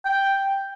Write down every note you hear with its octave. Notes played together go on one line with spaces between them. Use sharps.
G5